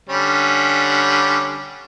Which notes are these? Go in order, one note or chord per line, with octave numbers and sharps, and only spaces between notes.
D3 G3 C#4